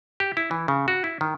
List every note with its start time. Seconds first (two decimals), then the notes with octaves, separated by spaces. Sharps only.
0.20 G4
0.37 E4
0.51 E3
0.68 C#3
0.88 F#4
1.04 E4
1.21 D#3